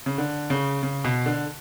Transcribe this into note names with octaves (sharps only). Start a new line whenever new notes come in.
C#3
D3
C#3
C#3
B2
D3